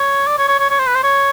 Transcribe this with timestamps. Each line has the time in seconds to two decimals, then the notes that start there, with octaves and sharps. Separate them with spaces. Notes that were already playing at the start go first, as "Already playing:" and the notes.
Already playing: C#5
0.27 D5
0.38 C#5
0.48 C#5
0.60 C#5
0.70 C#5
0.79 C5
0.87 B4
0.95 C5
1.04 C#5